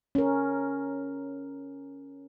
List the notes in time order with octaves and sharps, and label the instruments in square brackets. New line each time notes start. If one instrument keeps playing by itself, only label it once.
[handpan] C#4 A#4